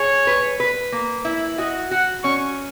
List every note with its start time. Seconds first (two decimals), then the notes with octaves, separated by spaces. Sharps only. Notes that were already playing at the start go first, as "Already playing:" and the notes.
Already playing: G#4 C#5
0.27 B4
0.60 B4
0.92 A#3
1.25 E4
1.58 F#4 D#5
1.91 F#4 F#5
2.24 C#4 C#6